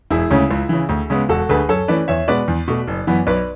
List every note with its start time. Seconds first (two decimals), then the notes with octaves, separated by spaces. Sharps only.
0.10 E1 E4 G#4
0.30 D2 C#3 G#3 C#4
0.51 C#2
0.69 C#3 E3
0.89 D2
1.10 C#3 G#3 B3
1.29 E1 F#4 A4
1.49 D2 D3 A3 G#4 B4
1.69 F#2 A4 C#5
1.88 E3 A3 C#4 B4 D5
2.08 E2 C#5 E5
2.28 B2 G#3 B3 B4 D5
2.48 E2
2.68 B2 A3
2.88 F#1
3.07 F#2 E3 B3
3.27 B1 B4 D5